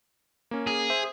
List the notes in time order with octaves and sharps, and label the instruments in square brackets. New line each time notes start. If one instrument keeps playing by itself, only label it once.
[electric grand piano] A#3 C#4
[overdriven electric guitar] G#4
[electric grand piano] C5 E5